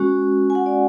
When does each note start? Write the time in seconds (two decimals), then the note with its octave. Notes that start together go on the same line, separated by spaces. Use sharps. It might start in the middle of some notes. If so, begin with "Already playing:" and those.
Already playing: G#3 C#4 F#4
0.50 G#5
0.55 F#5
0.66 D5